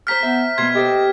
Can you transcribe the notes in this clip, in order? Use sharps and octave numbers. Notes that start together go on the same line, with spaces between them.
C5 A#5 F6 G6 B6
B3 E5
B2 B3 C6 G#6
G4 A4 C5 D#5